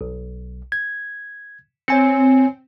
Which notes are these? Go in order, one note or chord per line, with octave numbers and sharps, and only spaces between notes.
B1
G#6
C4 C#5 G#5 C#7